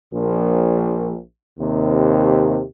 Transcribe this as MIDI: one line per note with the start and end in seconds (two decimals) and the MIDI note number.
0.12 1.16 34
1.59 2.60 39
1.59 2.60 48